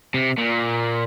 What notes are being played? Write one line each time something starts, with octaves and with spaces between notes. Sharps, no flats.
C3
A#2